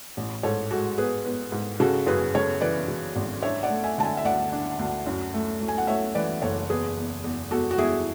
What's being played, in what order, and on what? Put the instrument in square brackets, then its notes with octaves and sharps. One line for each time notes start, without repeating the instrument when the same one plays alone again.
[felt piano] A1
G#2 A4 C#5
G#3 F#4 A4
B3 G#4 B4
B3
G#2
C#3 F#4 A4
F#2 G#4 B4
C#3 A4 C#5
E3 B4 D5
C#3
G#1
D4 C#5 E5
D5 F#5
A3
E5 G#5
D3 A5
E5 G#5
E5
D2 D5 F#5
D4
D2
F#2
A3
A3
G#5
F#5
A3 C#5 E5
E3 B4 D5
F#1 A4 C#5
E2 G#4 B4
E2
E2
E2 F#4 A4
F#4
E2 E4 G#4